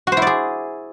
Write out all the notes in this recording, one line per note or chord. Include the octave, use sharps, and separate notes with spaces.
E4 F#4 G#4 C5 D5